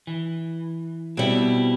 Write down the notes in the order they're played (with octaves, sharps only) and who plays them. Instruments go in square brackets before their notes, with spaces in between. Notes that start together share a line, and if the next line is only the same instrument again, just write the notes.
[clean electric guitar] E3
[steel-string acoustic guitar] B2 G3 [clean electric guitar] C4 E4